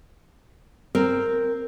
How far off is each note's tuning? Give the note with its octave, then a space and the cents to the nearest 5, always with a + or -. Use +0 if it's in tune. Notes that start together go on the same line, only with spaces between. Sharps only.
C4 +0 A#4 -10